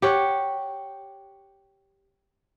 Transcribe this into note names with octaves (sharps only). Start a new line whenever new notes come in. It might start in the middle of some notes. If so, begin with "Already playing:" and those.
G4 C#5 F#5